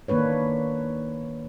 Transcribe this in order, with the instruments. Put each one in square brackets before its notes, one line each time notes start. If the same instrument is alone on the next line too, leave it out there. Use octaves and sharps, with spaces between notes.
[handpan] D#3 A#3 D4 B4 C#5